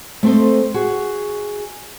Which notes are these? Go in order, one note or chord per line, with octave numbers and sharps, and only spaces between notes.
A3 C4 A4 C5 D#5
F#4 G#4